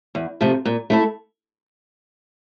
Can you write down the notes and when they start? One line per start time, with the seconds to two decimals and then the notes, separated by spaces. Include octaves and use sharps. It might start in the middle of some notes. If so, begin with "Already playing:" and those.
0.15 E2
0.41 C3 F3 A3
0.65 A#2
0.90 A3 E4 A4